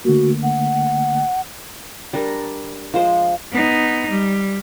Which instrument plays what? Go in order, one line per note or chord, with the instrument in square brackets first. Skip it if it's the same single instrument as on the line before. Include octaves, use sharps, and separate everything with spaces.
[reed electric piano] D3 A3 A#3 [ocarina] F#4
[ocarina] F#5
[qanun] G3 D4 A#4
F3 G#3 C5
[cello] B3 D#4
G3